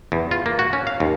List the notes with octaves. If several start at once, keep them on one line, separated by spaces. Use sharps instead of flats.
E2
F4
A#3
F#4
C#4
F5
D#2